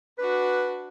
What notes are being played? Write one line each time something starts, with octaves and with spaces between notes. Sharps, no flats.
D4 F#4 B4